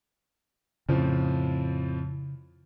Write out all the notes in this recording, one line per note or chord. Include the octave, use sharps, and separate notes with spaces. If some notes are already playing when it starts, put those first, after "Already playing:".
F2 A2 C#3 F3